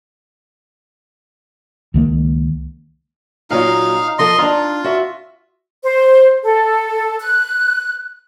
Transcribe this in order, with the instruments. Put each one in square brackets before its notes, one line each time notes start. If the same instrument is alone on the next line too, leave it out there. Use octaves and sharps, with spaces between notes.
[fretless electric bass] C#2 D#3 A#3
[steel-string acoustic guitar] A#2 F#3 F4 [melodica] D#4 F5
[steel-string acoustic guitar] F3 F4 A4 [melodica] D#5 C6
[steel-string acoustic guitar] D4 D#4 A#5 [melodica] F4
[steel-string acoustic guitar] F#4 E5
[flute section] C5
A4
F#6